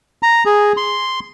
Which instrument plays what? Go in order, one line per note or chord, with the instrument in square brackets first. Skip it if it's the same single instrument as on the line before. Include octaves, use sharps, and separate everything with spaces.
[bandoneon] A#5
G#4
C6